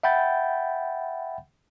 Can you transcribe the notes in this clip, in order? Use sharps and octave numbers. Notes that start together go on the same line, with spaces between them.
E5 F#5 G5 B5 G6 A6